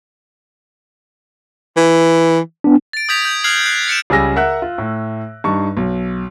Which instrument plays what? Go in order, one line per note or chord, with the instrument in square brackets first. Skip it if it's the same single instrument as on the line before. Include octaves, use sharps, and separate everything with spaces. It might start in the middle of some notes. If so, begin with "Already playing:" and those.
[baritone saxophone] E3
[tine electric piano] B3 D4
[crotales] A6 D7
D#6 G6 G#6 B6 F7
G6
F6 F#6 G#6 C7 F7 F#7
F#6 C7
A6 C#7 D7 E7
[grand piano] C#2 C#3 G3 G#5 E6 A#6
A#4 E5 F#5 F#6
F4
A2
G2 D#4 C#6
B1